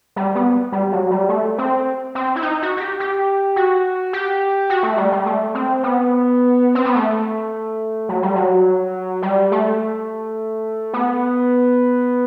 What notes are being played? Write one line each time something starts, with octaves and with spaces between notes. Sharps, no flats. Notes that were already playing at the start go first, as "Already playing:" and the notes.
G3
B3
G3
F#3
G3
A3
C4
C4
E4
D#4
F#4
F#4
G4
G4
F#4
G4
F#4
A3
G3
G3
A3
C4
B3
C4
B3
A3
F#3
G3
F#3
G3
A3
B3